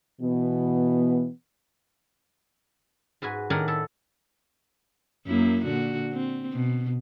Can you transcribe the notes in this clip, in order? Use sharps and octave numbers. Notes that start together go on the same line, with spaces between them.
B2 E3 B3
G#2 F#4 B4 G#5
A2 D#3 D4 A#4 F#5 G#5
E4 A4
F#2 A#3 E4
A#2 D3 F#4
C4
B2